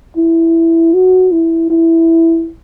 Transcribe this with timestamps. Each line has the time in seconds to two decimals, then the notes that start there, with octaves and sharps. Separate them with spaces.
0.17 E4
0.94 F#4
1.32 E4
1.70 E4